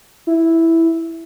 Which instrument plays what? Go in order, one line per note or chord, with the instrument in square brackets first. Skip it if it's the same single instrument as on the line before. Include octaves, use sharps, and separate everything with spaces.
[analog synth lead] E4